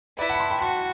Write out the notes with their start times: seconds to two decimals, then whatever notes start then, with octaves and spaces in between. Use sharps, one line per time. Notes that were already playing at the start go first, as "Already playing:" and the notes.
0.18 E4 B4 D5
0.29 F#5 A5
0.34 B5
0.40 A5 C6
0.50 G5 B5
0.60 F#4 A5 C6